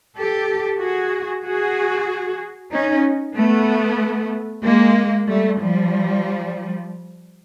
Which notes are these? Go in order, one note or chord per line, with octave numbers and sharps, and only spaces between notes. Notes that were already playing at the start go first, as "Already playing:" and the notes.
G4 A4
F#4 G#4
F#4 G#4
C#4 D#4
A3 B3
G#3 A#3
G3 A3
F3 G3